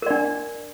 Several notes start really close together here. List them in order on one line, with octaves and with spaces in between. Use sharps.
A#4 D5 D4